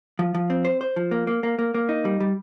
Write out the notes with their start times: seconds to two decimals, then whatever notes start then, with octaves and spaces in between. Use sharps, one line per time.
0.19 F3
0.35 F3
0.50 C4
0.65 C5
0.81 C5
0.96 F3
1.11 A#3
1.27 A#3
1.43 A#3
1.59 A#3
1.74 A#3
1.89 D#4
2.05 G3
2.20 G3